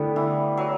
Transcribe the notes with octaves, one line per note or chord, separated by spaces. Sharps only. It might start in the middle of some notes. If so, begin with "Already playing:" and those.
Already playing: D3 G3 A3 B3 E4
E3
F#3